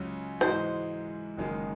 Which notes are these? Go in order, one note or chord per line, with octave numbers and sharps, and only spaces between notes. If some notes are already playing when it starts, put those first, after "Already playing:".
Already playing: C#2 C#3 F#3
G#2 E3 G#3 D#4 F#4 C5
F#1 F#2 D#3 G#3 D#4